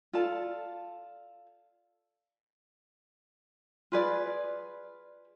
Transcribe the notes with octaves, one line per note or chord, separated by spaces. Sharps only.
F4 A4 D5 A5
F4 G#4 B4 D5